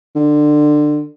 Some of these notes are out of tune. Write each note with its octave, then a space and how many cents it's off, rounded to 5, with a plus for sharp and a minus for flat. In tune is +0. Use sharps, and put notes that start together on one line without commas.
D3 +20